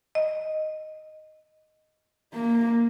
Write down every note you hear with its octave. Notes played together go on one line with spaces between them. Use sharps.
D#5
A#3